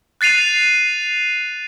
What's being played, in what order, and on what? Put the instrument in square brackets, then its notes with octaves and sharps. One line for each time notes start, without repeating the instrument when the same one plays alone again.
[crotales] F#6 A6 C7 D#7 F7